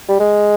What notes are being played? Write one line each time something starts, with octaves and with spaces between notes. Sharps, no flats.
G3
G#3